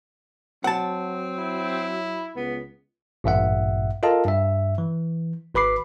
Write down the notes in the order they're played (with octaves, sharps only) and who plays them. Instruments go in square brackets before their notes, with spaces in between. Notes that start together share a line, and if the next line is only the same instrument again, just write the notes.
[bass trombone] F#3 [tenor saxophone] C4 [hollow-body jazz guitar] F#5 A5
[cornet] E4
[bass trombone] C#2 [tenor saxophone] B3
[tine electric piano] A1 G2 A#2 E5 F#5
F4 A4 A#4 D#5 F5 A5
G2 E5
E3
G#1 B4 B5 D6 C7